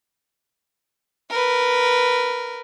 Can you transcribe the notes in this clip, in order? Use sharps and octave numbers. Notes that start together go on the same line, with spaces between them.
A#4 B4